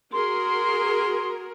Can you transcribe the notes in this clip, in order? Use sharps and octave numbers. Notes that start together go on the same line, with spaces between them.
F#4 G#4 A#4 C6